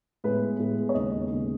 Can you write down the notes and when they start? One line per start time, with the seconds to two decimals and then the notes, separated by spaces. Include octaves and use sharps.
0.24 A2 G#3 B3 B4
0.59 A2 G#3 B3
0.89 C#5
0.94 D#2 C#3 G#3 B3 D#5
1.31 D#2 C#3 G#3 B3